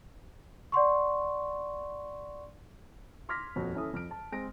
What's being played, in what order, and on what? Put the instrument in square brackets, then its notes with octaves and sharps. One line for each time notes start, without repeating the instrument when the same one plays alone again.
[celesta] D5 F#5 C6 C#6
[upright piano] C6 D6 F6 G#6 A#6 B6
D#1 F2 F#4 C#5
E3 C#4 E4 A4 D#6
F2 F6 D7
A5
G#3 C4 C6 A#6 D7